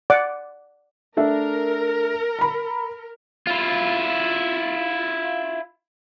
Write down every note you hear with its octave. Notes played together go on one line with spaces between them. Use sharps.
D5 F#5 D6
A3 D4 A#4 E5
A#5 B5
E4 F4